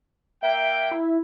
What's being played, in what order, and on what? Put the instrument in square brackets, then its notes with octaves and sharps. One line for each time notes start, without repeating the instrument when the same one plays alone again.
[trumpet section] A#3 G5 [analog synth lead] E5
[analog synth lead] E4